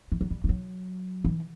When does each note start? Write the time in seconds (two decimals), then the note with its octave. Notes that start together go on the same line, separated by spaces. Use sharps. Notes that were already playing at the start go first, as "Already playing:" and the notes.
0.12 E3
0.21 F#3
0.30 G3
0.44 E3
0.49 F#3
1.25 E3